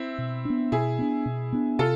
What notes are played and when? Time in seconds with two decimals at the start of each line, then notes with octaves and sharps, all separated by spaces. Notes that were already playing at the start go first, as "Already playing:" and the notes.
Already playing: C4 E4
0.18 B2
0.45 B3 D4
0.72 B2 E4 G#4
0.99 B3 D4
1.26 B2
1.53 B3 D4
1.79 C3 F4 A4